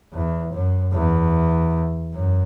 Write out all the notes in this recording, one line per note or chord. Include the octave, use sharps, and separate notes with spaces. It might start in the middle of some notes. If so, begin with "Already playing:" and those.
E2
F#2
E2
F#2